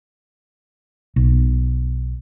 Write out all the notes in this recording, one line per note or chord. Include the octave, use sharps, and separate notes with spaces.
B1